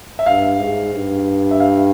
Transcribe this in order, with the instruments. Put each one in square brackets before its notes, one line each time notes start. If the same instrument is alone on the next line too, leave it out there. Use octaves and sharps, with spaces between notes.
[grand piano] E5
[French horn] G2 [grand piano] F5
[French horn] G#2
G2
[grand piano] E5
F5